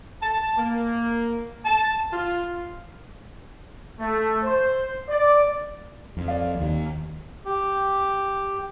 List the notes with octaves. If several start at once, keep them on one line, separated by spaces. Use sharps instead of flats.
A5
A#3
A5
F4
A3
C5
D5
F2
D5 D#5 F5
D#2 D#3
G4